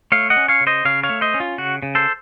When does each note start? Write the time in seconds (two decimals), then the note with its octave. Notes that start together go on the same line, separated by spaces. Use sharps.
0.12 A3 C#5 F5
0.30 D#5 F#5
0.37 C#4
0.48 C#5 F5
0.61 C#3
0.67 C5 D#5
0.85 C#3 C#5 F5
1.03 C#5 F5
1.09 A3
1.21 C5 D#5
1.34 C#4
1.40 F4
1.58 C#3 F#4
1.83 C#3
1.95 A4 C5